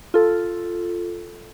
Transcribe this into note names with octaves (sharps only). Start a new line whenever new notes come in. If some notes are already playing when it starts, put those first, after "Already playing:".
F4 A4